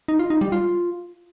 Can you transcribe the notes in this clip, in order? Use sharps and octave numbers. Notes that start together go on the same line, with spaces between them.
D#4
F4
D#4
G3
F4